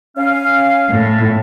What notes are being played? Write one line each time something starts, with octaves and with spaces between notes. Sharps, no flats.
C#4 F5
A2